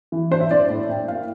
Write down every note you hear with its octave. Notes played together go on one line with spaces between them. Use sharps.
E3
D4 C5
E5
D4 D5
A2
A2 G5
A#3 F5